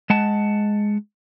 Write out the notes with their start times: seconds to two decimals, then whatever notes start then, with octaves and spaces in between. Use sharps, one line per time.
0.10 G#3 F#5 A5